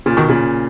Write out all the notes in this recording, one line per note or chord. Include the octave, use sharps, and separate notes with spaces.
A#2 C#3
B2 D#3
A#2 C#3